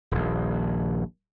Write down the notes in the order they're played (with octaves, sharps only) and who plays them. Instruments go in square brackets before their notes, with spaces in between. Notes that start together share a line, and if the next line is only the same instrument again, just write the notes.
[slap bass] D#1 A#1